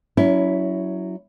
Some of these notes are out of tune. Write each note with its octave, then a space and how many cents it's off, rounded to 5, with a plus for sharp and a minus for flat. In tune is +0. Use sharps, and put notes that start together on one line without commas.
F#3 +0 C#4 +25 E4 +0